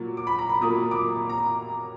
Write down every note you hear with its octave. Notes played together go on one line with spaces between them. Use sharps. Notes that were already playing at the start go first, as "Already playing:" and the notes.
Already playing: A#2 F#3 A#3
D6
B5
A#5
B5
A#2 F#3 A#3 D#6
D6
A#5